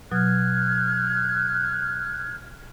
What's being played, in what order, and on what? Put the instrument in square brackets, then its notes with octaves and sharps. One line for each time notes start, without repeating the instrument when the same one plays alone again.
[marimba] B2 F#3 [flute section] F6 F#6 G#6